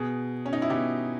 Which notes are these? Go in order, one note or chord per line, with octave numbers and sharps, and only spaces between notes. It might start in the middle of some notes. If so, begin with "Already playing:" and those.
Already playing: B2 G#4
C#4
D#4
E4
B2 G4